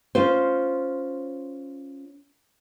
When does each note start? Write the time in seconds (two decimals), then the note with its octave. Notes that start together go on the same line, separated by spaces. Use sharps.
0.15 C#4 F4 C5